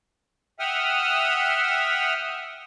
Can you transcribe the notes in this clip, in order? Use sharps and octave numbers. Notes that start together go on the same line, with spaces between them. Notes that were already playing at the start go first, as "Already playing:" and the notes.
E5 F#5 G5 D#6 F6